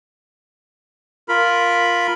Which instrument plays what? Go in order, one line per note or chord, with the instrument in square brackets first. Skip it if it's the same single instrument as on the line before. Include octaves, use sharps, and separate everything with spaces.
[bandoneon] F4 A#4 B5